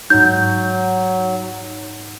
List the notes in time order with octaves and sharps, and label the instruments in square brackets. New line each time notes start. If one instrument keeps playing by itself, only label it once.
[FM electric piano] G#2 D#4 [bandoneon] F#3 [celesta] G6